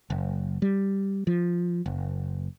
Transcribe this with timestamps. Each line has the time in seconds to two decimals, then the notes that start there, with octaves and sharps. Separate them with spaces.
0.10 F#1
0.62 G3
1.27 F3
1.86 F#1